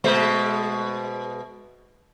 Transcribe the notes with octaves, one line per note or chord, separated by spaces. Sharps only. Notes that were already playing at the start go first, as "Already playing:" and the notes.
B2 G#3 C5